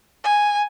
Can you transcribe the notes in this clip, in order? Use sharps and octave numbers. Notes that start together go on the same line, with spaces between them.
G#5